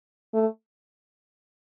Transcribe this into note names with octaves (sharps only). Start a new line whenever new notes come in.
A3